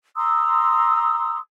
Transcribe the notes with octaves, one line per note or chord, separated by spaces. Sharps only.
A#5 C6 D#6 E6